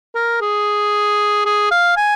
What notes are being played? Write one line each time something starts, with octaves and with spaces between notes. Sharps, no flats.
A#4
G#4
G#4
F5
G#5